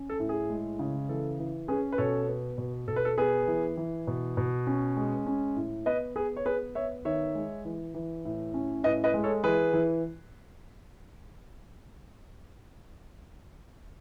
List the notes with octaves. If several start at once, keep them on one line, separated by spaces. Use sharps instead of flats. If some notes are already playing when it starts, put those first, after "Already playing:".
Already playing: C#4
A4
A2
G#4
G#3
C#3
E3 A4
E3
C#4 G#4 B4
B4
B2 A4 C#5
B3
B2
B2 A4
B4
A4
B3 G#4 B4
E3
E3
B2
B2
C#4
G#3
C#4
A2
B3 B4 D#5
B3 G#4 B4
C#5
B3 G#4 B4
B3 C#5 E5
D#3 C#5 E5
G#3
E3
E3
A2
C#4
A2 B4 D#5
B4 D#5
G#3
A4 C#5
E3 G#4 B4
E3